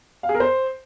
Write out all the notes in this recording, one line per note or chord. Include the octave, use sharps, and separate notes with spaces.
F5
G#4
A#4
C5